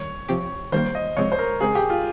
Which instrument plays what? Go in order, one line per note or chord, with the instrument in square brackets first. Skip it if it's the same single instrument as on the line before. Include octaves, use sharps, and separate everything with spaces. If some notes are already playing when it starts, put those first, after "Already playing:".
Already playing: [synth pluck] D#3 G3 [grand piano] C#5
[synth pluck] C3 F3 C4 G4
[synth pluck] D#3 G3 A#3 [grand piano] C5
[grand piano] D#5
[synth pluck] C3 F3 G#3 C4 [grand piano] C#5
[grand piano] C5
A#4
[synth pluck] C#3 G#3 C4 [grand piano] G#4
[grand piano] G4
F4